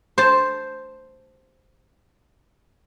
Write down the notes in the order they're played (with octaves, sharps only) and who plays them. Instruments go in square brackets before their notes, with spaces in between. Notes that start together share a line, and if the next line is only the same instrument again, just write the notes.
[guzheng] C5 A5